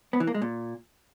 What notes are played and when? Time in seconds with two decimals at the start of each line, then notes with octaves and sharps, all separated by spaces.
0.13 B3
0.20 E3
0.27 A#3
0.34 G#3
0.42 A#2